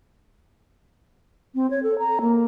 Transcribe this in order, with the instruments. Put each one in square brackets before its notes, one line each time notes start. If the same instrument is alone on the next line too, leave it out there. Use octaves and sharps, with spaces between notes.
[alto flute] C4
C#5
A4
A#5
A#3